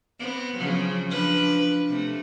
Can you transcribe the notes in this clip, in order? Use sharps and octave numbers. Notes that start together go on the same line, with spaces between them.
B3 C4
C#3 F3 F#3
F3 D4 B4
C3 A3